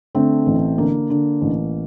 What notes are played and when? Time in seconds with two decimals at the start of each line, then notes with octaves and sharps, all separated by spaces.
0.15 D3 A3 C4
0.46 A1
0.78 D3 A#3
1.10 D3
1.42 A1